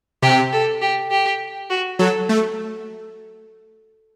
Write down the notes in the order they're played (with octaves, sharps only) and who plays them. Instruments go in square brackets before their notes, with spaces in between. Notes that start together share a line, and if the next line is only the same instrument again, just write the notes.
[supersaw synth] C3 [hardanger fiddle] G4
[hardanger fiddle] A4
G4
G4
F#4
[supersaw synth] F#3 [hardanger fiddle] A4
[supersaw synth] A3